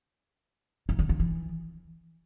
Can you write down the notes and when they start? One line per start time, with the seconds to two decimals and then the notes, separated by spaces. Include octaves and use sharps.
0.89 D#3
0.99 D3
1.09 D#3
1.20 E3